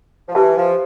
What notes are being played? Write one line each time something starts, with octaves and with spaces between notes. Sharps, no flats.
F3
E3 G4 B4 E5 A5
F3